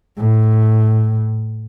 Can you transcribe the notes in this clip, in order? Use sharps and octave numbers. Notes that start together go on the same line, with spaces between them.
A2